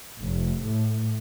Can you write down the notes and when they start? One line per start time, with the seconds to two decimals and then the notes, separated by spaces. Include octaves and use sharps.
0.22 F1
0.61 A2